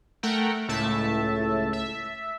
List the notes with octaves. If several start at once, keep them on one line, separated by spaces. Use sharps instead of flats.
A3 A#4 F#5 G5
C#2 A2 A3 E5 A5
E5